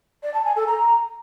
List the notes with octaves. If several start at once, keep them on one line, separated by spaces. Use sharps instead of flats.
D5
A5
G#5
A4
A#5